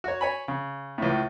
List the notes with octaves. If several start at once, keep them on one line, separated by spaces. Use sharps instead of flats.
F#4 C#5
C#5 G#5 B5
C#3
C#2 A2